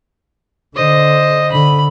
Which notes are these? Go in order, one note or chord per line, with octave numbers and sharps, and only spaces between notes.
D3 C5 D#5
D3 B5